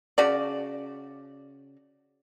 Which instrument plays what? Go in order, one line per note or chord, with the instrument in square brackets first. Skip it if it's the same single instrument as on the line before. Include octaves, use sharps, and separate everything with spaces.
[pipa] C#3 F#4 D5